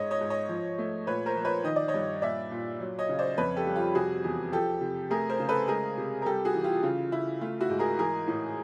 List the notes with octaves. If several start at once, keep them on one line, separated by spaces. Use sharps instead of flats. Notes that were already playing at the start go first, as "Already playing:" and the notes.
Already playing: G#2 C#5 D#5
C#5 D#5
G#2
C#5 D#5
F3
A3
A#2 B4 C#5
A#4 C5
F3
B4 C#5
D#3 D#5
D5
C#5 D#5
G2
A#2 D5 E5
A#2
F#3
C#5 D#5
C#3
C5 D5
F2 B4 C#5
G4 A4
G3
F4 G4
C3 F#4 G#4
E2
F3 G4 A4
C3
A3 G#4 A#4
A#4 C5
C#3
A4 B4
G#3 G#4 A#4
C3
A#4
G3 G4 A4
F#4 G#4
E3
F4 G4
C#3 F4
C#3 E4
A3 F4
E4 F#4
G#2
G#4 A#4
E3 G#4 A#4
A2